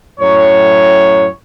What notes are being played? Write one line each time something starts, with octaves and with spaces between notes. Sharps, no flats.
F#2 A2 C#5